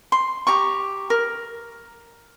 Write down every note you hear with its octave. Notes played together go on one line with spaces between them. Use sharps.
C6
G4 A#5 C#6
A#4